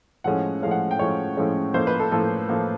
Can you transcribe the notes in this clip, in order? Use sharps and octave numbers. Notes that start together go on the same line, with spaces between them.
A2 F3 G#3 C#4 F#5
A2 F3 G#3 C#4 F5
F#5
G5
A2 F3 G#3 C#4 C#5
A2 F3 G#3 C#4
A2 F3 A#3 C5
B4
A4
A2 F3 A#3 A4
A2 F3 A#3